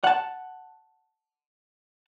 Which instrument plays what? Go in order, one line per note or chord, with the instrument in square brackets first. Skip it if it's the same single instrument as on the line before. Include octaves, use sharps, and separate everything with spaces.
[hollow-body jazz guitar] F#5 A5